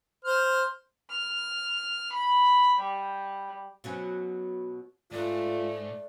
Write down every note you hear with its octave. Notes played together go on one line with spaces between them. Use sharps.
C5 F6
F6
B5
G3
B2 F#3 C#4
G#2 A3 F4 D5